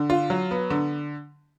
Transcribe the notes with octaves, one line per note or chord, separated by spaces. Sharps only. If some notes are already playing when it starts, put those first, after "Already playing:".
Already playing: D3
F4
F#3
B3
D3